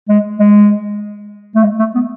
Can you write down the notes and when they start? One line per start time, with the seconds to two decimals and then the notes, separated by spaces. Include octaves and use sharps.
0.09 G#3
0.40 G#3
1.56 A3
1.63 G#3
1.79 A3
1.95 B3